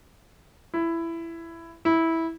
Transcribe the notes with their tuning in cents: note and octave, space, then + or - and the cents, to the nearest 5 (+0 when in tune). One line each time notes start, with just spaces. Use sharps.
E4 +15
E4 -10